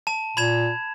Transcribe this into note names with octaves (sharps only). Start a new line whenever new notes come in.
A5 E7
A#2 B5 G#6 E7